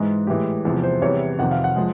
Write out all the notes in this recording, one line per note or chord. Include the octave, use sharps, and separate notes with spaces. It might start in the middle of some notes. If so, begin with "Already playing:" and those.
Already playing: G#2 E3 G#3 D#4
A2 E3 G#3 G4
E2 C3 F3
C5
E2 C3 E3 G3 C#5
F2 C3 D#3 F#5
F5
F#5
F3 G#3